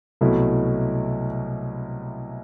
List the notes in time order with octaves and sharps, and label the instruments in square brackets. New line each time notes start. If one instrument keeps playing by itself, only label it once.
[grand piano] C2 B2 F#3 A3 E4